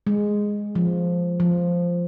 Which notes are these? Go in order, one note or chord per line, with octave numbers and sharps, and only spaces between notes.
G#3
F3
F3